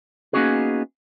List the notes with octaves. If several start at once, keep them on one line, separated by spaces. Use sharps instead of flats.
A#3 B3 C#4 D#4 F#4 G#4